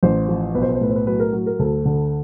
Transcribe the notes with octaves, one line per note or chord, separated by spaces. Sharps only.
A1 C5
F3
B1 B4
C5
B4
C5
A2 B4
C5
B4
F#3 B4
A#4
F#3
A#4
D2 A4
D3